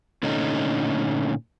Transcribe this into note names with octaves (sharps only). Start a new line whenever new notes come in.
A#2 D3 A3 C#4 D#4